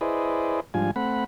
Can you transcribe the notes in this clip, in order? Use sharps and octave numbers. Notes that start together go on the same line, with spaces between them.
E4 G#4 B4 C5 D5 D#5
G#2 F3 G3 D4 F4 G#5
A3 C4 F#5 B5